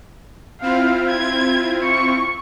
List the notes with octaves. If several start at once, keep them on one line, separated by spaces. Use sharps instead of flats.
C4 E4 F4 F5
G#6
C#6